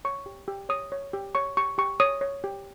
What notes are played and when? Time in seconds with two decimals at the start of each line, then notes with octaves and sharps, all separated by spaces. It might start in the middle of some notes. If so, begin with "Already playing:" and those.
0.05 C#5 C#6
0.26 G4
0.48 G4
0.69 C#5 D#6
0.92 C#5
1.13 G4
1.35 C#5 C#6
1.57 G4 C#6
1.78 G4 C#6
2.00 C#5 D#6
2.21 C#5
2.44 G4